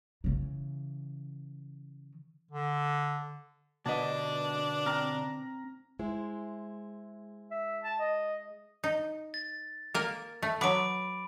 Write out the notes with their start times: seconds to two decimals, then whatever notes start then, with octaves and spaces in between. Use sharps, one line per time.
0.24 C#3 E3
2.51 D3
3.86 B2 D3 B3 D4 B4 D#5 A5
4.86 C4 A#5 F6
5.99 G#3 E4 C5
7.51 E5
7.83 A5
7.99 D#5
8.84 D#4
9.34 A6
9.94 A#3 A#4
10.42 A3
10.61 F#3 B3 B5 D6 D7